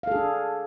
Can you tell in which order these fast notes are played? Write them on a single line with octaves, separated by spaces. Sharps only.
F5 A4 G#4 D4